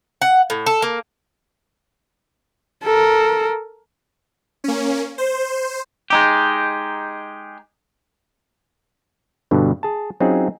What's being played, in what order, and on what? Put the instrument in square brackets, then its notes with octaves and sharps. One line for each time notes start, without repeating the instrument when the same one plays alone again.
[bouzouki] F#5
A2
A4
A#3
[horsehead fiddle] A4 A#4
[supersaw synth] A#3 C#4
C5
[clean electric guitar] G#3 D#4 G4
[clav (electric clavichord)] G2 B2 D3
G#4 A5
F#3 C4 C#4 D#4 F4 G#4